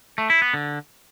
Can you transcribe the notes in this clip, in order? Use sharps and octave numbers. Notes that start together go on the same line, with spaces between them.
A3
E4
B3
D3